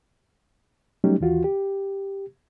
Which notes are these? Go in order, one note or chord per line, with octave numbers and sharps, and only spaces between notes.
F#3 G3 A3 C#4 D#4 G4
D#2 E3 F4 F#4
G4